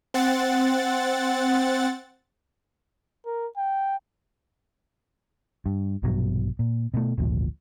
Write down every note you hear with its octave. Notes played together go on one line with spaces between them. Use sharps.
C4 F#5 A6
A#4
G5
G2
A#1 G2 B2 F#3
A#2
B2 A3
G#1 D2 A#2 F3